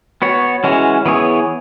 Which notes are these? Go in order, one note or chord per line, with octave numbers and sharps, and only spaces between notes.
B3 F#4 C#5
E3 G#3 C#4 F#4
E3 B3 G#4 C#5